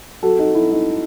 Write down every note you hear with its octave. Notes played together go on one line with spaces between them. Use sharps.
F#3 F#4 A4
D#4 F#4
F#3 E4
D#4